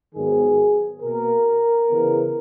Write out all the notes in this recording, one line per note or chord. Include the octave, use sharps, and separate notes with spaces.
G#2 D#3 F#3 B3 G#4
B2 A#3 A#4
C#3 E3 B3